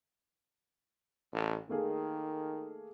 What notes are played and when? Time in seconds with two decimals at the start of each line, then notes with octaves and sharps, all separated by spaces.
1.33 A1
1.69 D#3 A3 A#3 G#4